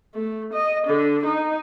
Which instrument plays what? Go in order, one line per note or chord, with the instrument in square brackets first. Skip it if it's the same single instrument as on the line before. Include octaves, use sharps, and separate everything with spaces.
[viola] A3
D#5
D3
D#4